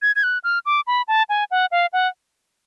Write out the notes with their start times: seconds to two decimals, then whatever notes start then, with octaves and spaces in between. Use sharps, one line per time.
0.02 G#6
0.16 G#6
0.23 F#6
0.44 F6
0.66 D6
0.87 B5
1.08 A5
1.29 G#5
1.51 F#5
1.72 F5
1.93 F#5